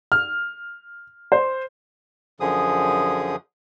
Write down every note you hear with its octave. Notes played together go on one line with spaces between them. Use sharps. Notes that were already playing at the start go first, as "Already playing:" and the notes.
F6
C5
F#2 D3 F3 G#4 D#6